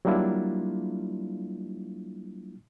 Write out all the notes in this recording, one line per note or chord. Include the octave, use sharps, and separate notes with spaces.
F#3 G3 A#3 D4 E4 F4